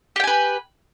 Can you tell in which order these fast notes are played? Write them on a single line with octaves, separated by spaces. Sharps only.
G4 G5 G#5 B4